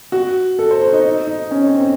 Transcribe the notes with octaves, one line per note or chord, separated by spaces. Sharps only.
F#4
A4
C5
C5
D#4
D#4
D#4
C#4
C4
C4